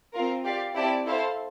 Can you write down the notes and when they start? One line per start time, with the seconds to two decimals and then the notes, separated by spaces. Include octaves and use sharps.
0.13 C4 F4 A#4
0.44 G4 D5 F5
0.75 C4 E4 G4 D5 A5
1.05 E4 A4 C5 F5 A5